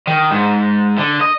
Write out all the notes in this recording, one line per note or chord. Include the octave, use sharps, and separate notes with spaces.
D#3
G#2
D3
D#5